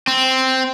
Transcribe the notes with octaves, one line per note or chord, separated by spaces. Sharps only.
C4